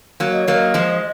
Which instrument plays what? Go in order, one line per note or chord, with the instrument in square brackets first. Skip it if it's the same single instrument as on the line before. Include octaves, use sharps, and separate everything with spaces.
[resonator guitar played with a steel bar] F#3 A#3
[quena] D#5
[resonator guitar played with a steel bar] F#3 A#3 [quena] C#5
[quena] D#5
[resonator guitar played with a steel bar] F3 G#3